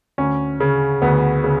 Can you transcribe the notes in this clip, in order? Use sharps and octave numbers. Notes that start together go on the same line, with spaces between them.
D2 C#4
C#3
D2 B3
C#3